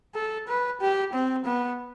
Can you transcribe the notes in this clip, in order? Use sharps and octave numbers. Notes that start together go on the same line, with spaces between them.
A4
B4
G4
C4
B3